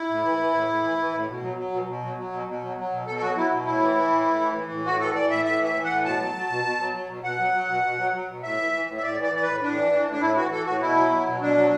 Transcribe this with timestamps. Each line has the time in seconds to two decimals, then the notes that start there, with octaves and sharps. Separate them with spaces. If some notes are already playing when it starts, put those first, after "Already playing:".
Already playing: E4
0.09 A2
0.24 E3
0.39 E3
0.53 A2
0.69 A2
0.83 E3
0.98 E3
1.13 A2
1.28 B2
1.43 F#3
1.57 F#3
1.72 B2
1.88 B2
2.02 F#3
2.17 F#3
2.32 B2
2.47 B2
2.62 F#3
2.77 F#3
2.92 B2
3.07 B2 A4
3.17 A4
3.21 F#3 F#4
3.36 F#3 E4
3.52 B2
3.66 A2 E4
3.81 E3
3.96 E3
4.11 A2
4.26 A2
4.41 E3
4.55 E3
4.71 A2
4.85 A2 F#4
5.00 E3 A4
5.15 E3 D5
5.30 A2 E5
5.45 A2 E5
5.60 E3 E5
5.75 E3
5.85 F#5
5.90 A2
6.05 B2 A5
6.20 F#3
6.34 F#3
6.49 B2
6.65 B2
6.79 F#3
6.94 F#3
7.09 B2
7.23 B2 F#5
7.39 F#3
7.54 F#3
7.69 B2
7.83 B2
7.98 F#3
8.13 F#3
8.28 B2
8.43 A2 E5
8.58 E3
8.73 E3
8.88 A2
8.97 E5
9.02 A2 D5
9.18 E3 D5
9.32 E3 D5
9.42 A2 B4
9.62 A2 D4
9.77 E3
9.92 E3
10.07 A2 D4
10.21 A2 E4
10.36 E3 F#4
10.51 E3 A4
10.66 A2 F#4
10.81 B2 E4
10.96 F#3
11.11 F#3
11.26 B2
11.41 B2 D4
11.56 F#3